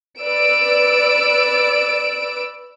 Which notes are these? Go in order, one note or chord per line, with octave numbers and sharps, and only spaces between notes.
B4 D5 E6 D7